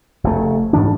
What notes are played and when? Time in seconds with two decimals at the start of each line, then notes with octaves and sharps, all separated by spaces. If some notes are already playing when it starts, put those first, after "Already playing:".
0.24 F1 C#3 A3
0.73 G#2 E3 F3 D4